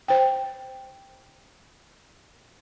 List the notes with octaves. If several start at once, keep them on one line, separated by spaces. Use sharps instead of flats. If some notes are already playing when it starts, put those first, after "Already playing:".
C5 G5